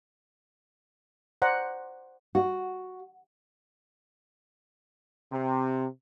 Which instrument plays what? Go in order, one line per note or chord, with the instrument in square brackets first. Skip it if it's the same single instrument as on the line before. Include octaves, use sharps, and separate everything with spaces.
[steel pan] C5 D5 F#5 A#5
[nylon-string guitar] F#4
[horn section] C3